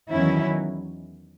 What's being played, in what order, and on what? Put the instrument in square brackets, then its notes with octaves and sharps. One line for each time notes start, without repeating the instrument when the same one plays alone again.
[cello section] E2 D#3 F#3 C#4 E4